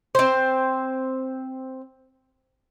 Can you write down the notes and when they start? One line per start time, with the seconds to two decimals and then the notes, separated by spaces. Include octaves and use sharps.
0.15 C4 C5